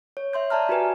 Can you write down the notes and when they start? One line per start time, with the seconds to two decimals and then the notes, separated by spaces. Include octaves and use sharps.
0.17 C#5
0.33 E5 C6 G6
0.50 D5 E5 A5 A#5 F6
0.69 F#4 G4 B4 G#5